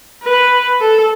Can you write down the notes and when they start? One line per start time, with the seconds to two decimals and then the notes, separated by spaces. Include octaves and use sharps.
0.23 B4
0.80 A4